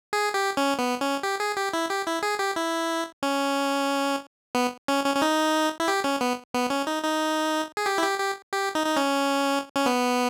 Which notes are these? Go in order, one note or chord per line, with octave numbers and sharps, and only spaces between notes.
G#4
G4
C#4
B3
C#4
G4
G#4
G4
E4
G4
E4
G#4
G4
E4
C#4
B3
C#4
C#4
C#4
D#4
E4
G4
C#4
B3
B3
C#4
D#4
D#4
G#4
G4
E4
G4
G4
G4
D#4
D#4
C#4
C#4
B3